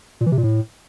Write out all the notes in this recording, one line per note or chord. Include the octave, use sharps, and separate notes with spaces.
A#2
E3
C3
A#2
A2